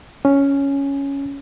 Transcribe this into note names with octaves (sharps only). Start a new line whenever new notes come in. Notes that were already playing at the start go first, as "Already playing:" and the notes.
C#4